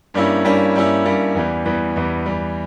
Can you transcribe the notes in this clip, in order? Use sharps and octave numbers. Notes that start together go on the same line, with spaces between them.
G2 G3 A#3 C#4 E4
G2 G3 A#3 C#4 E4
G2 G3 A#3 C#4 E4
G2 G3 A#3 C#4 E4
E2 E3 G3
E2 E3 G3
E2 E3 G3
E2 E3 G3